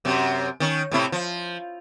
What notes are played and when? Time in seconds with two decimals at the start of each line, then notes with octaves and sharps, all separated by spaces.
0.05 F#2 C3
0.60 D#3 C#4
0.91 A2 C3 E4
1.12 F3